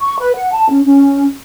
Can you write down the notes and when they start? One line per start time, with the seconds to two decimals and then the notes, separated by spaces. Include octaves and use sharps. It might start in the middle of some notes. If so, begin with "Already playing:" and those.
0.02 C#6
0.19 B4
0.35 F#5
0.53 A5
0.69 C#4
0.86 C#4